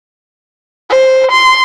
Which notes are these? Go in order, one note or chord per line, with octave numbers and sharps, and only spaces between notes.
C5
C6